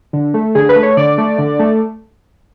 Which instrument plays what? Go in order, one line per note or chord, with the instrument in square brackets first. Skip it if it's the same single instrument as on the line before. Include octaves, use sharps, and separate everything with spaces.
[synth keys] D3
A3
D3 G#4
B4
A3
C#5
D3 D5
A3
D3
A3